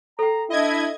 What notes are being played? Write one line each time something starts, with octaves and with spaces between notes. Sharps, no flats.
A4 G5 A#5
D4 E4 D#5 G#6